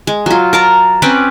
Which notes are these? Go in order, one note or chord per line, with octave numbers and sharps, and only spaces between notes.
G#3
F#3 F4
A#4 A5 A#5
C4 C#4 B4 D5